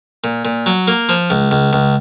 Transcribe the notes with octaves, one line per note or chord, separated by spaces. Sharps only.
A#2
A#2
F#3
A#3
F3
C#2
C#2
C#2